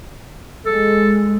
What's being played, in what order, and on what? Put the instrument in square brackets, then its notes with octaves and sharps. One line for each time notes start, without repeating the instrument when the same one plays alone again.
[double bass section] G#3 [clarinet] A4